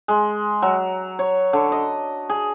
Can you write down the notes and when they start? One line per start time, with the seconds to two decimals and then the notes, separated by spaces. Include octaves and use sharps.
0.08 G#3
0.62 F#3
1.19 C#5
1.53 D3
1.72 D#5
2.30 G#4